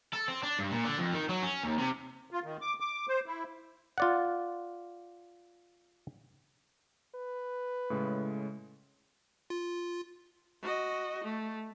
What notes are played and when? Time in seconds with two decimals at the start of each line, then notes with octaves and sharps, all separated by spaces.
0.13 A4
0.28 C4
0.43 D4
0.59 G2
0.71 A#2
0.85 D3
0.98 F2
1.13 D#3
1.29 F#3
1.42 C#4
1.63 D#2
1.78 C3
2.31 F4
2.44 D#3
2.61 D6
2.80 D6
3.08 C5
3.26 E4
3.98 F4 D5 F#5
7.15 B4
7.90 A2 C#3 G#3
9.50 F4
10.62 F#4 D#5
11.23 A3